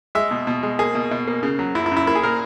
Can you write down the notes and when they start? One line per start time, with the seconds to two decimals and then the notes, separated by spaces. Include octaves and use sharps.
0.15 G#3 E5
0.31 B2
0.47 B2
0.63 G#3
0.79 A#3 G#4
0.95 B2
1.11 B2
1.27 A#3
1.43 C#3
1.59 F#3
1.75 F#2 E4
1.86 E4
1.92 F#2
1.97 E4
2.07 A#3 E4
2.15 G#4
2.23 A#2 A#4